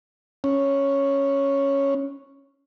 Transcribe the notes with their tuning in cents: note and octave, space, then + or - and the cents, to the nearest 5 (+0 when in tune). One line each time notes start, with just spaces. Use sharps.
C#4 +0